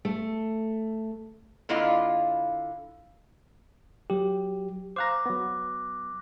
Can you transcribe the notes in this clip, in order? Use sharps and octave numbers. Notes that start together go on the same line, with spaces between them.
A3
D3 A#3 E4 F4 D#5 F5
F#3 G4
C5 F5 A#5 D6 F#6 A#6
F#3 B3